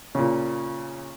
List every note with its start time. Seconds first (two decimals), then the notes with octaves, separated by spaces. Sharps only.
0.15 A#2 C#3